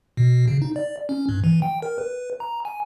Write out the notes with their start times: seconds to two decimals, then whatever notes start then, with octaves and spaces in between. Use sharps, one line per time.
0.17 B2
0.48 C#3
0.62 D#4
0.76 D5
1.09 C#4
1.29 G2
1.44 E3
1.62 G5
1.82 A#4
1.98 B4
2.40 A#5
2.65 G#5